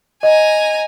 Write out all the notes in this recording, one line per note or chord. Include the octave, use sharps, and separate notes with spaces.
D#5 G#5 A#5